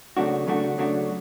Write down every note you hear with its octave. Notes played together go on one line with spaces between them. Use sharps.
C#3 F#3 A3 D4 F#4
C#3 F#3 A3 D4 F#4
C#3 F#3 A3 D4 F#4